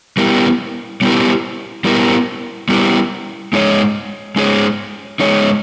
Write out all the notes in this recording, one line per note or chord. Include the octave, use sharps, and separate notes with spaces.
G3 B3 E4 G4 A#4
G3 B3 E4 G4 A#4
G3 B3 E4 G4 A#4
G3 B3 E4 G4 A#4
G#3 D#4 G#4 C#5
G#3 D#4 G#4 C#5
G#3 D#4 G#4 C#5